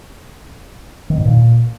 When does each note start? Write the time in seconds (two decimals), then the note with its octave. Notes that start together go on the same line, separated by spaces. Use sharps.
1.10 D#3
1.18 G#2
1.25 A#2